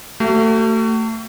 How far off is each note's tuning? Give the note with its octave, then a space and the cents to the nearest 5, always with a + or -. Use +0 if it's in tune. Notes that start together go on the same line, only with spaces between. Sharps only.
A3 +30 F#4 +45